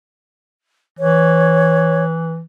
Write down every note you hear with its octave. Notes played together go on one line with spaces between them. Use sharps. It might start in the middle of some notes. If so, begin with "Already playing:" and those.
E3 C#5